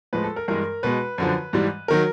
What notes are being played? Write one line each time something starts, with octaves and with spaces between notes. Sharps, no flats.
A2 F3 G#3 B4
A4
A#4
G2 E3 G#3 A#4
B2 G#3 B4
F#2 D3 F3
G#2 E3 G3
D#3 F#3 A#4